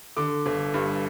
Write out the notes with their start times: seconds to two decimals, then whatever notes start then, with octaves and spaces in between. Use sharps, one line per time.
0.17 D3 D6
0.46 G1
0.74 G2